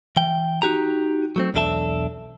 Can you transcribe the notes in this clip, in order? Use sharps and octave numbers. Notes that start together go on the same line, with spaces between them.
E3 G5
D#4 F#4 G4 A#5
F#3 A3 C4
B1 E2 D4 A4 E5 A5